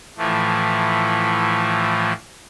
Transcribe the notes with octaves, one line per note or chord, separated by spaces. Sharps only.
A2 E3 F3 A3